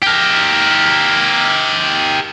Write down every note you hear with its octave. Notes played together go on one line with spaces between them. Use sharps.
G4 A#4